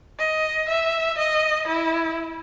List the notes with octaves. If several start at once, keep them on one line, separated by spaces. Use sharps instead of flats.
D#5
E5
D#5
E4